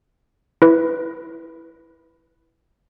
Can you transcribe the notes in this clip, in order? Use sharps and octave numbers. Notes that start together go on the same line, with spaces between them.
E4 B4